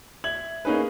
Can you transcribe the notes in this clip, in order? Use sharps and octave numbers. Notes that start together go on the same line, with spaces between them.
E5 G#6 F#7
A#3 C#4 D#4 G#4 B4